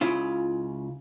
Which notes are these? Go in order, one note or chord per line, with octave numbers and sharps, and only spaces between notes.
C#2 C#3 E4 F4